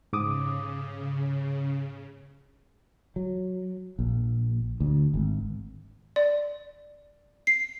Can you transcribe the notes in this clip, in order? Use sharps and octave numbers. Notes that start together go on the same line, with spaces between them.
G#2 C#3 D6 D#6
F#3
A#1
D2
G#1
D5
C7